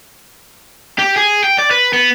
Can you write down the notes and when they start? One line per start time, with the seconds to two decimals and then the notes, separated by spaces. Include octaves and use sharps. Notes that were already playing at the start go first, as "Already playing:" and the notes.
0.99 G4
1.16 G#4
1.44 G5
1.58 D5
1.71 B4
1.93 B3